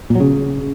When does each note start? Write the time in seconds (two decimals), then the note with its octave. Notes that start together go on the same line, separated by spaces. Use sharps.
0.10 A#2
0.15 F#3
0.20 C#3